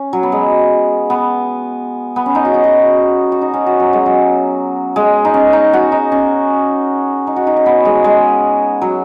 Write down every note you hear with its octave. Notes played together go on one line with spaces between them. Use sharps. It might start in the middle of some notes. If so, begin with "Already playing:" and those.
Already playing: C#4
F#3
B3
G#3
B3
B3
C#4
D#4
F#4
D#4
F#4
F#4
D#4
C#4
F#4
F#3
G#3
F#3
G#3
D#4
C#4
D#4
F#4
D#4
C#4
D#4
F#4
D#4
C#4
B3
G#3
G#3
F#3